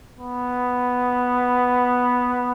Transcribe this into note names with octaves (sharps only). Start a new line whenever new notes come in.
B3